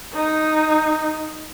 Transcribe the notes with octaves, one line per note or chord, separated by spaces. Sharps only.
D#4